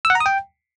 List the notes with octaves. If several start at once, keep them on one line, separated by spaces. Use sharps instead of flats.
E6
F#5
A#5
D#6
G5